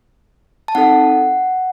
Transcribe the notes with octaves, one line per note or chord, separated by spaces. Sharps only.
A5
C4 D#4 A4 F#5